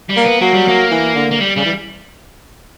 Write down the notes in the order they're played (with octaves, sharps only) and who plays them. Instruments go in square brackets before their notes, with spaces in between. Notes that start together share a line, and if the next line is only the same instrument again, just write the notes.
[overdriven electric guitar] G3
[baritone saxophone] A#3
[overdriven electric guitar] B3
[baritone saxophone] F#3 [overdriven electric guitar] A#3
[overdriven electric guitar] G3
A#3
[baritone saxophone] E3
D3
[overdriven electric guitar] A#3
G3
[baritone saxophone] C#3 [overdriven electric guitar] G3
[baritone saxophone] E3